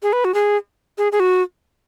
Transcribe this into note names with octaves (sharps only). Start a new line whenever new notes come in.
G#4
B4
F#4
G#4
G#4
G#4
F#4